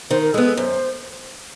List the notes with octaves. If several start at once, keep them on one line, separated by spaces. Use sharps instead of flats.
D#3 C5
A#4
G#3 B3 A4
A4
F#2 C5